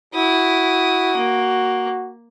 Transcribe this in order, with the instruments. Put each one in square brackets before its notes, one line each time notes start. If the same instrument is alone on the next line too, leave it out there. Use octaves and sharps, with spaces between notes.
[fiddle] E4 D#6 [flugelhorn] F#4
[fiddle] A#3